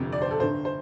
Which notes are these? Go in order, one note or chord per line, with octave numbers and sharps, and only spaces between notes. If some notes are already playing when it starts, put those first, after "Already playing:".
Already playing: G1 F2 C3
D5
C5
A4
G1 G2 D3 C5
C5